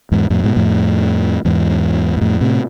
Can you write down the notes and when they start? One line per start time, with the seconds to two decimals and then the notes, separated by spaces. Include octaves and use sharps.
0.12 E2 G#2
0.30 F2 A2
0.44 G#2 B2
0.56 F2 A2
1.45 E2 G#2
2.17 G#2
2.21 F2 A2
2.41 A2 C3